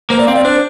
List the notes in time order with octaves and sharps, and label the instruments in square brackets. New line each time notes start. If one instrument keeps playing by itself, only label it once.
[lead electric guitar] A#3 [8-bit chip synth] C5
[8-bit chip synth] D5
[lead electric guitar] C4 [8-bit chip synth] F5
[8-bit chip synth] D5
[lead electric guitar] D4 [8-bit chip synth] C5